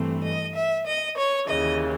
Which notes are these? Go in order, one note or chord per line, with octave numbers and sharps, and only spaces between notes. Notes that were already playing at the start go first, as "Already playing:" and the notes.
Already playing: G2 E3 A3 C4
D#5
E5
D#5
C#5
D#2 C#3 E3 D#5